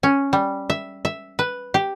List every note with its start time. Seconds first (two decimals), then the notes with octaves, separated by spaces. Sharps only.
0.03 C#4
0.33 G3
0.70 E5
1.05 E5
1.39 B4
1.74 G4